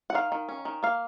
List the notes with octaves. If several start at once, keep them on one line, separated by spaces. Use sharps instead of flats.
F#5
D#3 F5
D#3
C#4
D#3
A#3 F5